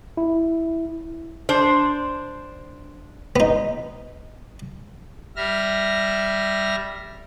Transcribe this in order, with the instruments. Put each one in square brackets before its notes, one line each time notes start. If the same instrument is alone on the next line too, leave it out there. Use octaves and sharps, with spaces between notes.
[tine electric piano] E4
[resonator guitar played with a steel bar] D4 C5
[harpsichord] B3 D#4
[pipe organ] G3 E5 F6 A#6